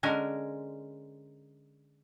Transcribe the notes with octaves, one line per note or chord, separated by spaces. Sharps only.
D3 G#3 C#4 A#4 C#5